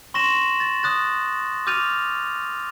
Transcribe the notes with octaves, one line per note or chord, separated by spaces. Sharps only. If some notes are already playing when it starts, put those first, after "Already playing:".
C6 C#6 A#6 E7 F#7
A6
D#6 F#6 A6
D6 F6 G6 A6 D#7 F7